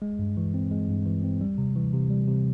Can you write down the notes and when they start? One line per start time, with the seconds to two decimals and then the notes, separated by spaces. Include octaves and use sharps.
0.02 G#3
0.19 G2
0.37 E3
0.54 C4
0.71 G#3
0.89 G2
1.05 E3
1.23 C4
1.41 G3
1.58 C3
1.76 E3
1.93 C3
2.10 G3
2.27 C3